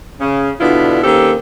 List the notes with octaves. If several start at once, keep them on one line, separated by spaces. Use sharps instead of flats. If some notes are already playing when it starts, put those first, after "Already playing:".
C#3
B2 D3 B3 D4 E4 F4
D#3 A#3 C4 C#4 G4 A4